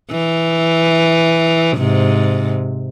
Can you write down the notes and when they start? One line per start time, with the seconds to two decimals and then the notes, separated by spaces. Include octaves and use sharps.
0.11 E3
1.77 G#2 C3